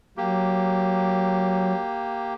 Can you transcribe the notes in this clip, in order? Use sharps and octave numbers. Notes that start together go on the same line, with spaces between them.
F#3 A#3 G4